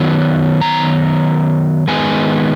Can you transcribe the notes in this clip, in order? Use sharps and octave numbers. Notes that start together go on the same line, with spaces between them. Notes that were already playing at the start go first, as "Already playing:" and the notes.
Already playing: D#3 F#3 B3 G#5
A#5
D#3 G#3 B3 G#5